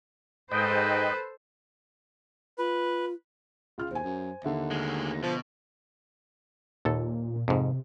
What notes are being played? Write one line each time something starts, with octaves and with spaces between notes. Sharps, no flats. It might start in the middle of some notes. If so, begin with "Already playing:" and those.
G#2 A4 B4 C5 D#5 G5
F4 B4
C#2 F4 F6
D#2 C5 G#5
F#2
D#2 D3 E5
D2 G#3
B2 F3
D#2 A#2 A4
F2 G#2 C3